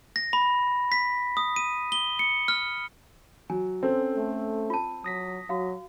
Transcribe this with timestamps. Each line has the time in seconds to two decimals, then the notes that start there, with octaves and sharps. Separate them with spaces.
0.16 A#6
0.33 B5
0.92 B6
1.37 D#6
1.56 D#7
1.92 G7
2.19 C#7
2.48 F6
3.50 F#3 G#5
3.83 C4 C#4 A4 C5
4.16 A3
4.70 F4 A5
5.04 F#3 D#6 A#6 B6
5.49 F#3 F#4 F5